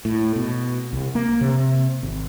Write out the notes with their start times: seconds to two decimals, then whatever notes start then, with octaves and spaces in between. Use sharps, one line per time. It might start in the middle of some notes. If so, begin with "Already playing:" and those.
0.05 A2
0.36 B2
0.93 C2
1.15 A#3
1.41 C3
2.03 G#1